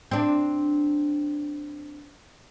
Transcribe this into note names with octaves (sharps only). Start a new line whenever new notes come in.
C4 D4